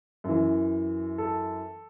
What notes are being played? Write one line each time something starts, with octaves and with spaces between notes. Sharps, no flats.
F#2 E3
A4